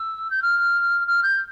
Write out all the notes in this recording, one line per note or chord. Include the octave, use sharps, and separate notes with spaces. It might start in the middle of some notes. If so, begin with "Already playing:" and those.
Already playing: E6
G6
F6
F6
G6